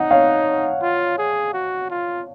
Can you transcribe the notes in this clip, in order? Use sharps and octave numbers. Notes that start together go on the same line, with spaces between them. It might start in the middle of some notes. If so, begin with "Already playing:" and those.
Already playing: D#4 D#5 F#5
C#5 F5
F4
G#4
F#4
F4